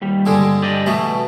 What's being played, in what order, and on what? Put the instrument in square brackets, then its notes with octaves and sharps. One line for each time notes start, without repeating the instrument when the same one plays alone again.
[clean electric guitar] D#2 G3
[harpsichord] G2 D3 G#3
[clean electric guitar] G4 D5 D#5
[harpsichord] B2 E3 [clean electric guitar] A3